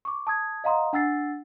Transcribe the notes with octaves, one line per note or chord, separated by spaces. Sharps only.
C#6 D6
A5 D#6 G#6
D#5 F5 F#5 A#5 C6 D#6
D4 F#5 E6 A6 C7